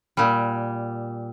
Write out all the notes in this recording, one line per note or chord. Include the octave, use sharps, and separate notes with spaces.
A#2 G3